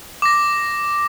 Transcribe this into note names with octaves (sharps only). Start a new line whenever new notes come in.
D6 A#6